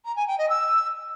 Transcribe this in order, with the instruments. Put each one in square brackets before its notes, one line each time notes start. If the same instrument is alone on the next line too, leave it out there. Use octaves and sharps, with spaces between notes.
[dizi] A#5
G#5
G5
D#5
E6